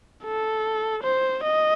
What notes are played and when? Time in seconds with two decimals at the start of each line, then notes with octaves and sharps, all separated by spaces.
0.23 A4
1.03 C5
1.43 D#5